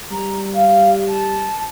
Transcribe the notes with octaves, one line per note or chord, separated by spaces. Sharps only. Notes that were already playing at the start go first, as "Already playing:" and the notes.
G3 A#5
F5
A5